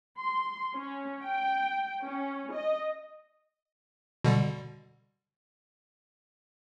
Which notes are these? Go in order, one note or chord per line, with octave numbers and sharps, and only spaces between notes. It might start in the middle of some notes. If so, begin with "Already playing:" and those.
C6
C#4
G5
C#4
D#5
B2 D3 G3